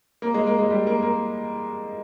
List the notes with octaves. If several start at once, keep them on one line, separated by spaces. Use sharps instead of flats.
A#3
G#3
A#3
G#3
G3
A#3
A#3